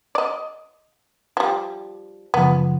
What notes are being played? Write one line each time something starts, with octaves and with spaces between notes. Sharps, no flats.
D5 D#5
F3 G3
F#2 C#3 F3 B3